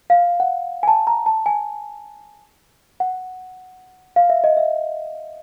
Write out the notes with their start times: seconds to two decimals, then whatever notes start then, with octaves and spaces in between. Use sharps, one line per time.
0.10 F5
0.40 F#5
0.83 G#5
0.88 A5
1.07 A#5
1.26 A5
1.46 G#5
3.00 F#5
4.16 F5
4.30 E5
4.44 D#5
4.57 E5